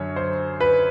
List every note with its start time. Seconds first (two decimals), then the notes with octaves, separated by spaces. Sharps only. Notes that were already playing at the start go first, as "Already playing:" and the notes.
Already playing: F#2 D3 C#5
0.16 C5
0.61 B4